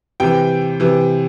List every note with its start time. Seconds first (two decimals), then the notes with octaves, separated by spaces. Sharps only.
0.20 C3 E3 G5
0.80 C3 E3